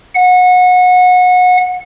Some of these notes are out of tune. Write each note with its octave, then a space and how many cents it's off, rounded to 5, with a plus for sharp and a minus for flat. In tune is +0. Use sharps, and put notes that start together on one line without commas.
F#5 -25